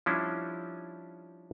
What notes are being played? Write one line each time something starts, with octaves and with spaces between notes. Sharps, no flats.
F3 G3 C#4 D4 E4